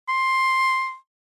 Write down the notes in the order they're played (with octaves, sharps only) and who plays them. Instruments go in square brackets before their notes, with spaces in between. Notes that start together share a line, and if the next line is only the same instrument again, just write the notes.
[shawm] C6